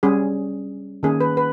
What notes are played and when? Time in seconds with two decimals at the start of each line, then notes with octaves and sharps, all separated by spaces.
0.03 G3 C#4 G#4
1.03 D#3 A#3 C#4 G#4
1.21 B4
1.37 B4